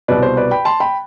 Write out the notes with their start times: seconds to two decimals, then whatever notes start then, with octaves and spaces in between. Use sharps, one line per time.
0.08 C2 B2 B4 D5
0.22 C5
0.37 B4 D5
0.51 G5 B5
0.65 A5 C6
0.80 G5 B5